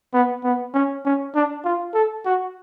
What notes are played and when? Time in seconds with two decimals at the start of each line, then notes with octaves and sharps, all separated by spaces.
0.13 B3
0.44 B3
0.74 C#4
1.05 C#4
1.35 D4
1.64 F4
1.94 A4
2.25 F#4